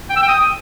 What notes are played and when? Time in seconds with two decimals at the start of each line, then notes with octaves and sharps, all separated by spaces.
0.10 G5
0.16 E6
0.22 G5
0.29 D#6